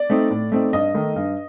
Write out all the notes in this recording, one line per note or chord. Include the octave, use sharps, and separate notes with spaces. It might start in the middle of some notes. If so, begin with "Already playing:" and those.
Already playing: D5
A3 C4 D#4
A2
A3 C4 D#4
G2 D#5
D#3 A3 D#4
G2